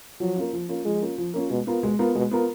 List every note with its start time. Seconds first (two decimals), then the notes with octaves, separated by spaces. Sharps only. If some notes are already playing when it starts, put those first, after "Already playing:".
0.20 F3 F#3
0.36 A#3 C#4 F4
0.53 F3
0.69 A#3 C#4 F4
0.85 F3 G#3
1.01 A#3 C#4 F4
1.18 F3
1.34 A#3 C#4 F4
1.50 B2 G#3
1.67 B3 F4 A#4
1.83 B2 G#3
1.99 B3 F4 A#4
2.15 B2 G#3
2.31 B3 F4 A#4